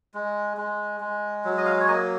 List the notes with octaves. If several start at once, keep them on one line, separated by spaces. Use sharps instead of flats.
G#3
G#3
G#3
F#3
D#5
F5
C#5
A#3 D#5